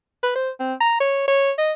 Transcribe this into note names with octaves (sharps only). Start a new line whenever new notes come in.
B4
C5
C4
A#5
C#5
C#5
D#5